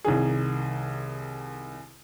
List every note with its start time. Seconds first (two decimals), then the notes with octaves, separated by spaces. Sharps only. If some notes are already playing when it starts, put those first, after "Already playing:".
0.05 C2 D#3 G#4